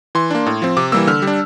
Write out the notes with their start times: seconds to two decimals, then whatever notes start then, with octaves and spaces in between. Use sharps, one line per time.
0.15 E3 C6
0.31 A#3 D4
0.46 A2
0.62 F3 C4
0.77 C3 D6
0.92 E3 G3 A#3 E6
1.07 D3 F6
1.22 G3
1.27 D4